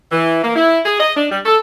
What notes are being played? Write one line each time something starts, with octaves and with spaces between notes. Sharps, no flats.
E3
A#3
E4
G#4
D#5
D4
G3
A4